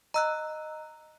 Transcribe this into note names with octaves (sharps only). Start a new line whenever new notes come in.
D#5 A#5 E6 F#6